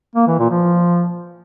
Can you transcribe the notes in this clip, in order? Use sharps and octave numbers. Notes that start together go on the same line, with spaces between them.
A#3
E3
A#2
F3